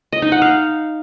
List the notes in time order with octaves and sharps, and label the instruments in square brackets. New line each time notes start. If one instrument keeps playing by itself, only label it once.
[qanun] D#5
D#4
F#5
F5